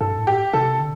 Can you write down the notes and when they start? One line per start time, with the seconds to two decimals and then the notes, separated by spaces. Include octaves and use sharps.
0.01 G2 A4
0.18 A2
0.27 G4
0.53 C3 A4
0.79 D3